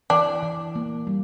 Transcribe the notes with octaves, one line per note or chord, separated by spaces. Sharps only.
E3 D4
E3
A#3
G3